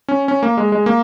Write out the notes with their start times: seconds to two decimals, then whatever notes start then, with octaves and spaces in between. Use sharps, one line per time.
0.08 C#4
0.28 C#4
0.43 A#3
0.57 G#3
0.72 G#3
0.86 A#3